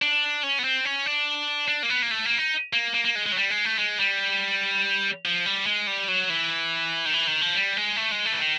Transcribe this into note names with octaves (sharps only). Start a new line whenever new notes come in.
D4
C#4
B3
C4
C#4
D4
D4
A#3
B3
A#3
A3
A#3
D#4
A#3
A#3
A#3
G#3
G#3
F#3
G3
G#3
A3
G#3
G3
F3
G3
G#3
G3
F#3
E3
D#3
E3
D#3
F3
G3
G#3
A3
G#3
A3
E3
D#3